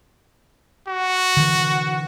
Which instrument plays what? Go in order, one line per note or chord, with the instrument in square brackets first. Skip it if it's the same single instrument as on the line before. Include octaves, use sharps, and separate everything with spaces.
[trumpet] F#4
[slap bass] D3 E3